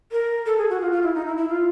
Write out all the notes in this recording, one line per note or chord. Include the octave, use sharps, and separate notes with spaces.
A#4
A4
G#4
F#4
F4
F4
E4
D#4
E4
E4
F4